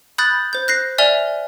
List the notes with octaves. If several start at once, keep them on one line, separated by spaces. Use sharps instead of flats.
B5 D#6 F#6 G6 A6
C5 G6
F#6 A#6 C7
D5 E5 G#5 F6 F7 G7